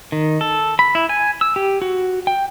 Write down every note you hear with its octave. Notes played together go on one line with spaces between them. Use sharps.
D#3
A4
B5
E4
G#5
E6
G4
F#4
G5